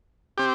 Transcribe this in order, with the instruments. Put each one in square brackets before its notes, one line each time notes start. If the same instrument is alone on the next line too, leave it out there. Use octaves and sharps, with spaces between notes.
[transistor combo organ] C4 G4